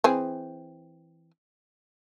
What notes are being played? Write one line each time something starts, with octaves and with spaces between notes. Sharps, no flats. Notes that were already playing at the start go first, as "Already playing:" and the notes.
E3 C4 G#4